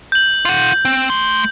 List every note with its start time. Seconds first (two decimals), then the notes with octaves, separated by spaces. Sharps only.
0.12 G6 F#7
0.45 F4 F#5
0.85 C4
1.10 A3 C6